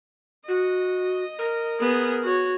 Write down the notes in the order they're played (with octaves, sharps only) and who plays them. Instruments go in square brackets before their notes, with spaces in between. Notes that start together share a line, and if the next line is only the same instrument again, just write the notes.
[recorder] F#4 [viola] D#5
[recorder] A#4
[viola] B3 G#4
F#4 C#5